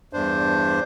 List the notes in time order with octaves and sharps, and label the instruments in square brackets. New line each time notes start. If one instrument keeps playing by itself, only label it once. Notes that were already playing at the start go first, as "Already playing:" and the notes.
[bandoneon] E2 G2 D4 C5